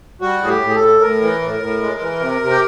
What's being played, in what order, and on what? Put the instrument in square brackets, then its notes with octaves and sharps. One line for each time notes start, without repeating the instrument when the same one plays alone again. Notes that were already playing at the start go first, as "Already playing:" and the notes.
[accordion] G3 F#4
A2 G#4
G4
A2
G#4
A4
A2
A2 A#4
E3
A2
A2
G#3
E3
C3
C3
G4